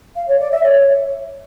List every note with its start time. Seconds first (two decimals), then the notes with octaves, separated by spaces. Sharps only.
0.16 F5
0.28 C#5
0.40 D5
0.52 E5
0.63 C#5